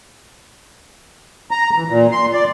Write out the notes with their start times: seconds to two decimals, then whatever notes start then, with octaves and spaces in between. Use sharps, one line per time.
1.51 A#5
1.76 E3
1.89 A#2
2.11 C6
2.33 D5